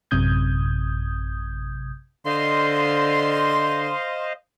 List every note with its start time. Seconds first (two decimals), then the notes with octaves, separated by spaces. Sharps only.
0.11 A1 F#2 C3 D#6 G6 G#6
2.26 D3 C5 D#5 F5 C6